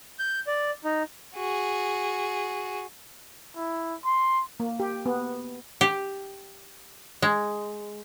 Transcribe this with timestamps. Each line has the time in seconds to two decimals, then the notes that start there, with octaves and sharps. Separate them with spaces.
0.19 G6
0.47 D5
0.84 D#4
1.36 F#4 G#4
3.56 E4
4.05 C6
4.60 A#3
4.80 G4
5.06 B3
5.81 G4
7.22 G#3